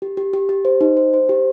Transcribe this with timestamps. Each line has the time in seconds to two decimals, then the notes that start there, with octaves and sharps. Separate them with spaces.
0.02 G4
0.17 G4
0.33 G4
0.49 G4
0.65 C5
0.81 D#4
0.97 C5
1.13 C5
1.29 G4